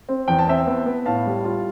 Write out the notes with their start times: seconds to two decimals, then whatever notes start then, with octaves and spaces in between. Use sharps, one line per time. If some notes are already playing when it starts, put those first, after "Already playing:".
0.09 C4
0.28 E2 G5
0.39 A5
0.48 C4 E5 G5
0.67 B3
0.86 B3
1.06 A2 F5 A5
1.26 G3
1.45 F4